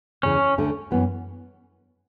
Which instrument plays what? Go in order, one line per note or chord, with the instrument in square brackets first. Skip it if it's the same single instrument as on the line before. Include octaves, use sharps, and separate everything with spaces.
[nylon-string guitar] E2 C#3 E3 [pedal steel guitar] C#4
[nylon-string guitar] D2 D3 A3
F#2 E3 B3